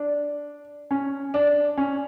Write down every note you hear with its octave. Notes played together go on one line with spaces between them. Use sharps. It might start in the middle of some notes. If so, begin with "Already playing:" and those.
Already playing: D4
C#4
D4
C#4